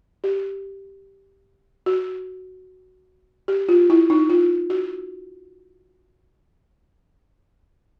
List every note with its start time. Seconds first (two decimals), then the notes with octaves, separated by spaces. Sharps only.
0.24 G4
1.86 F#4
3.48 G4
3.69 F4
3.90 E4
4.10 D#4
4.29 F4
4.70 F#4